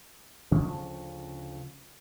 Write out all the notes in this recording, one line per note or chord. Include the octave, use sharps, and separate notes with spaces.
D2 C#3 F3 C#4